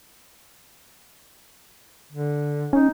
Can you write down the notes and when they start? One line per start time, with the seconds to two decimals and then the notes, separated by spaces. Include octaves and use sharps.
2.12 D3
2.73 C#4 D#4